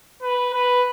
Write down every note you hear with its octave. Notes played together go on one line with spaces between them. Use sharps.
B4
B4